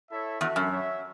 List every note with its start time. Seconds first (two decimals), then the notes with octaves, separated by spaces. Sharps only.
0.12 E4 A4 C#5 E5
0.41 E2 F#4 A4 E5
0.56 F#2
0.71 F#4 C#5 E5